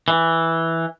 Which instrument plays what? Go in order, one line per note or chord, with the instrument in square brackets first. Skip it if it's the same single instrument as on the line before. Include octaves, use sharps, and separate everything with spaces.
[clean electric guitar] E3